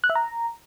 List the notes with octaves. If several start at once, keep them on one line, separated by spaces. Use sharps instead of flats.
F#6
E5
A#5